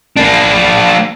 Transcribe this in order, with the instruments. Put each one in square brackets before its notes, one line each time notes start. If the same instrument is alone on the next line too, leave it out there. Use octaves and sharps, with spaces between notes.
[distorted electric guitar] A#3 D4